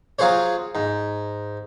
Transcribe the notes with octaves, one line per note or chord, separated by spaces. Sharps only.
F#3 F4 G#4 C5 C#5
G#2